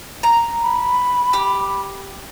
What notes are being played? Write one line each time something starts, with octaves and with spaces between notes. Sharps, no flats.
A#5
B5
G4